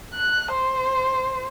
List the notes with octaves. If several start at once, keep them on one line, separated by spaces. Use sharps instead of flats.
F#6
C5